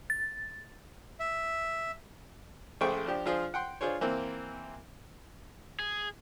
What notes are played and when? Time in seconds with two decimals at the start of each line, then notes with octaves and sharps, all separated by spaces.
0.10 A6
1.20 E5
2.81 A#1 C#3 A3 C5 G5 C#6
3.06 F3 D4 G4
3.26 F3 D4 F4 G#4 C5
3.54 F#5 G5 C6
3.81 D4 F4 G#4 C5 C#5
4.01 E3 A#3 C4
5.80 G#4